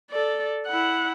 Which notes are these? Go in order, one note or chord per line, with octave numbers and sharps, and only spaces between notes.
A4 D5
E4 F#5